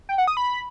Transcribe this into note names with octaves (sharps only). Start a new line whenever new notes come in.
G5
F#5
D#6
B5